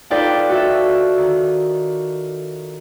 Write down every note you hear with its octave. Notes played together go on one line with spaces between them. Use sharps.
D#4 F4 A4 B4 D5 G5
F#4 A4 E5
D#3